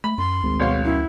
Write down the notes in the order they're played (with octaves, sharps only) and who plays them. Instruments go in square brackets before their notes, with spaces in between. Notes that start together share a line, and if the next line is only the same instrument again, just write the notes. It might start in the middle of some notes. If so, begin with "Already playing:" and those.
[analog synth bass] A3 [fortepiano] B5
[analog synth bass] F#2 [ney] C6
[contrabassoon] G#1 [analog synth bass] D2
[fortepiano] B1 C#5 F5
[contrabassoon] F#2 [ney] E4